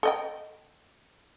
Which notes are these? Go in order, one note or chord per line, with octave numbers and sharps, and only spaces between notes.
A4 D#5 G5